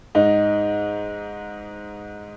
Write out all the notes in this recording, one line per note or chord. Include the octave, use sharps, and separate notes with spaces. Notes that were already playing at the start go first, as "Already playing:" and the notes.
G#2 D#4